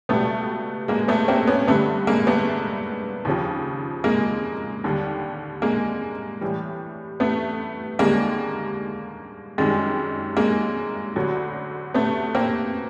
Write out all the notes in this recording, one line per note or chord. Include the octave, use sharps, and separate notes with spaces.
C#2 B2 G3 A3 B3
G#3 A#3
A3 B3
A#3 C4
B3 C#4
G2 D3 G3 A3 B3
G#3 A#3
A3 B3
D#2 C#3 F3
G#3 A#3
D#2 D3 G3
G#3 A#3
A2 E3 G3
A3 B3
D#2 D3 G3 G#3 A#3
F#2 D#3 G3 G#3
G#3 A#3
D2 D3 F#3
A3 B3
A#3 C4